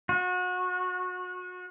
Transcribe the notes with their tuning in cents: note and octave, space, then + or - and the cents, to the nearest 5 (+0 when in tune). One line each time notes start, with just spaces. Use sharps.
F#4 -30